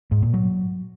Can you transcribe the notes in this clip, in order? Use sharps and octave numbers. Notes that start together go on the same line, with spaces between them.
G#2
A#2
F#3